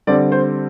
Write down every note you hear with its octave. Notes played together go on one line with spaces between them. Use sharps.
D3 G3 C4 D5
C5